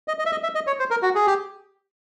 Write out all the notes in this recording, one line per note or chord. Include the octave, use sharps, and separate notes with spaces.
D#5
D#5
E5
D#5
E5
D#5
C#5
C5
A#4
F#4
G#4
G4